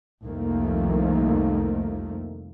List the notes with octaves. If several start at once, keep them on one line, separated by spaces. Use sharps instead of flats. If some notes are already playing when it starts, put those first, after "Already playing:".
C2 F2 D#3 F3 A3 A#3